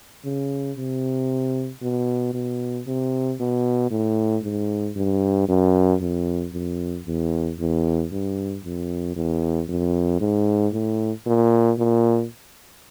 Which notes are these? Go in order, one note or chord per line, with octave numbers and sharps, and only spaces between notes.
C#3
C3
B2
B2
C3
B2
A2
G#2
G2
F#2
F2
F2
E2
E2
G2
F2
E2
F2
G#2
A2
A#2
A#2